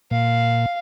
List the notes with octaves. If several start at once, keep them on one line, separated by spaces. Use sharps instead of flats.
A#2 F5